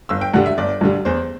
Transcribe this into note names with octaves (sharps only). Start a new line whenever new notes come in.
G1 E6
G5
G2 D3 G3 F#5
E5
G1 D5
G2 D3 G3
E2 C5